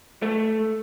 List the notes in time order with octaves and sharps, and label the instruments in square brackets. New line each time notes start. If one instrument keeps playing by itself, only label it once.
[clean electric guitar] A3